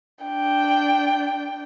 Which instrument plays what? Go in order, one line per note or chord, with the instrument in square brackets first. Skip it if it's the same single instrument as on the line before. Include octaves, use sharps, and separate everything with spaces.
[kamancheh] D4 G5